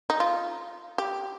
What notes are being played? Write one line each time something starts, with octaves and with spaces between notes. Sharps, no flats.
D#4
F4
G4